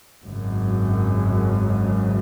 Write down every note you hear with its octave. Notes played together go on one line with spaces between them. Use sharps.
G#1 F#2 C#3